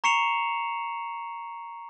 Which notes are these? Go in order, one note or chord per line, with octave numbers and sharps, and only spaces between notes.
A#5 C#6 C7 C#7 E7 F7